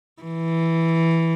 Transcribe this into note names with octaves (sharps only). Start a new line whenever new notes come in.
E3